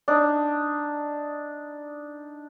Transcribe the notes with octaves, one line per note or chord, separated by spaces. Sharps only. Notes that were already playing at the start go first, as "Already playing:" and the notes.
D4 D#4